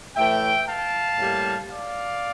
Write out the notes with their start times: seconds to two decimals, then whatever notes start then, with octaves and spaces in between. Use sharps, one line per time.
0.16 A2 E3 A3 E5 G5
0.67 F5 A5
1.18 A2 G3 A#3
1.70 D5 F5